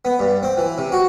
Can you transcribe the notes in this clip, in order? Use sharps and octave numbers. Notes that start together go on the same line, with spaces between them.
B3
G2
C4
E3
C3
F#4